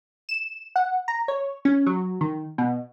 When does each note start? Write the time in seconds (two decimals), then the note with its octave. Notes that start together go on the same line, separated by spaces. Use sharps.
0.29 E7
0.76 F#5
1.08 A#5
1.28 C#5
1.65 C#4
1.87 F#3
2.21 D#3
2.58 B2